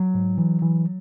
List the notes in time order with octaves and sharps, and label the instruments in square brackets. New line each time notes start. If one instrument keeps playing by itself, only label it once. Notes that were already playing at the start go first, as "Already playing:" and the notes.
Already playing: [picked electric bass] F#3
[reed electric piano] G#2
E3
E3